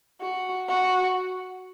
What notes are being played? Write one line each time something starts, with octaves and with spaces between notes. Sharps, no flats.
F#4
F#4